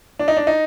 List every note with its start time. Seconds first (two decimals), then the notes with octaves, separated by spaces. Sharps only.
0.19 D4
0.28 D#4
0.37 D4
0.47 D#4